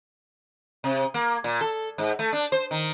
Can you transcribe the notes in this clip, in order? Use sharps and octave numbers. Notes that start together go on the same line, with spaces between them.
C3
A#3
A#2
A4
G#2
A3
D4
C5
D#3